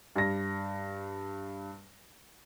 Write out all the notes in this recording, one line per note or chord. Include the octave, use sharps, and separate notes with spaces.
G2 A#6